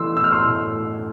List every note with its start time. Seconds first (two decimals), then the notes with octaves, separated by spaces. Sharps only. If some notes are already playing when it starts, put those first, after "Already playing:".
Already playing: E3 A3 C6 E6
0.16 A2 E6
0.24 F6
0.32 C6 E6
0.45 A2
0.73 A2